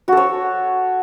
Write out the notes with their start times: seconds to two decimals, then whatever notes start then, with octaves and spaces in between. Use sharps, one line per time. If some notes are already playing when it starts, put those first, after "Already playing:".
0.08 F#4
0.12 A4
0.17 C#5